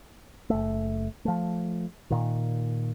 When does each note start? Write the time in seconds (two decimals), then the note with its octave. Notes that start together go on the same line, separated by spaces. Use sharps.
0.50 F#1 A3
1.25 F3 A3
2.10 A#2 D#3